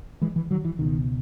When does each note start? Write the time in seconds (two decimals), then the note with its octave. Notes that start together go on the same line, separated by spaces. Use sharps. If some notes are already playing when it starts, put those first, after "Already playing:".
0.22 E3 G#3
0.36 E3
0.51 D#3 F#3
0.65 E3
0.79 C#2 B2 D#3